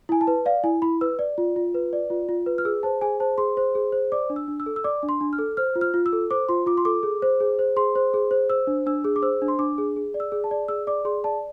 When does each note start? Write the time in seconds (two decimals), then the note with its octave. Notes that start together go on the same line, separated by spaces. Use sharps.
0.09 E4 G#5
0.21 A5
0.27 B4
0.45 D5 F5
0.64 E4 G#5
0.82 E4 B5
1.01 B4 E6
1.19 D5
1.38 F4
1.56 F4
1.74 B4
1.93 D5
2.10 F4
2.29 F4
2.46 B4
2.58 F6
2.65 G#4 E6
2.83 C5 A5
3.01 G#4 G#5
3.20 C5 A5
3.38 G#4 C6
3.57 C5
3.75 G#4
3.92 C5
4.12 D5 D6
4.30 D4
4.36 E6
4.48 D4
4.60 E6
4.66 A4
4.76 E6
4.84 D5 D6
5.03 D4
5.09 C6
5.21 D4
5.33 F6
5.39 A4
5.57 C5 F6
5.76 F4
5.81 F6
5.94 F4
6.06 E6
6.13 A4
6.31 C5 D6
6.49 F4 C6
6.66 F4 D6
6.77 C6
6.85 A4 D6
7.03 G#4
7.22 C5
7.40 G#4
7.59 C5
7.76 G#4 C6
7.95 C5
8.14 G#4
8.31 C5
8.50 C5 E6
8.67 D4
8.86 D4 E6
9.04 G#4
9.16 D6
9.22 C5 E6
9.42 D4
9.48 C6
9.59 D4 D6
9.78 G#4
9.96 G#4
10.14 D5
10.20 E6
10.32 G#4
10.44 A5
10.51 D5
10.68 G#4 E6
10.87 D5 D6
11.05 G#4 C6
11.24 D5 A5